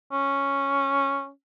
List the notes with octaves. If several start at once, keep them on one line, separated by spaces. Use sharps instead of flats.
C#4